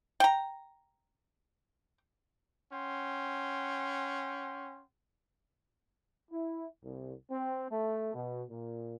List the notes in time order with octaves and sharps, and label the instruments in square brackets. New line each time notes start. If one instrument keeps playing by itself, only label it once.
[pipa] G5 A#5
[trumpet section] C#4 F#5 G5 C6
[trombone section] E4
C2
C4
A3
B2
A#2